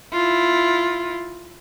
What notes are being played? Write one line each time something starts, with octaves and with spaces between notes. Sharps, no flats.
E4 F4